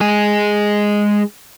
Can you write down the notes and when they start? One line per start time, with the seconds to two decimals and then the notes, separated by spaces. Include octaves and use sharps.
0.01 G#3 G#4